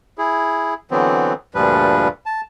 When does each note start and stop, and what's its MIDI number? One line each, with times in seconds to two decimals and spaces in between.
0.18 0.74 64
0.18 0.74 68
0.91 1.33 50
0.91 1.33 52
0.91 1.33 54
0.91 1.33 59
0.91 1.33 60
1.55 2.08 38
1.55 2.08 43
1.55 2.08 46
1.55 2.08 53
1.55 2.08 55
1.55 2.08 71
2.26 2.41 81